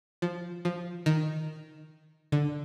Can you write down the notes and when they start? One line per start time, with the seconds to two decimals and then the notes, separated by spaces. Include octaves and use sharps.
0.22 F3
0.65 F3
1.06 D#3
2.32 D3